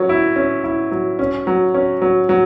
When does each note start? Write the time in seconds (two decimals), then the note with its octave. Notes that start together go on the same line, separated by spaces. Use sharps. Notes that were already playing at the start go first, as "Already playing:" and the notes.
Already playing: F#3 C#4
0.09 E4
0.36 C#4
0.64 E4
0.92 F#3
1.19 C#4
1.47 F#3
1.74 C#4
2.02 F#3
2.29 F#3